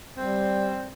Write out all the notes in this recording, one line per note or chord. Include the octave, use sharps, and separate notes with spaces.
G3 C4